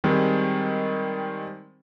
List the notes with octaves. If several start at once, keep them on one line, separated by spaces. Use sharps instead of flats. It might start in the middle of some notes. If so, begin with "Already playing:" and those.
D#3 G3 G#3 C4